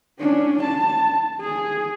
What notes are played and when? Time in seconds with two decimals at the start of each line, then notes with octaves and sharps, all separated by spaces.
0.20 C#4 D4
0.63 A5
1.41 G#4